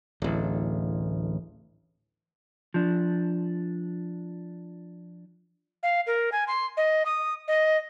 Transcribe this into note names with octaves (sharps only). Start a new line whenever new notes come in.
D1 A1
F3 D4
F5
A#4
G#5
C6
D#5
D#6
D#5